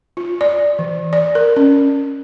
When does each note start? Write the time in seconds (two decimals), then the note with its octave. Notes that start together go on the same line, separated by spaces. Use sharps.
0.17 F4
0.41 D5
0.79 E3
1.13 D5
1.35 A#4
1.56 C#4